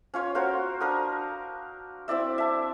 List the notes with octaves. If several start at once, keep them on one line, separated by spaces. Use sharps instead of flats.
C#4 F4 C#5
F#4 A#4 C5 F5
D4 A#4 D#6
C4 E4 D5 E5
E5 A5